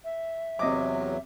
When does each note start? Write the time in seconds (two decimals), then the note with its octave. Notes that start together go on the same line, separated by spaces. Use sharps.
0.05 E5
0.59 E2 C3 F#3 D#5 D6